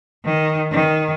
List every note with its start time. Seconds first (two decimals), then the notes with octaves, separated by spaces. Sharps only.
0.25 D#3
0.71 D#3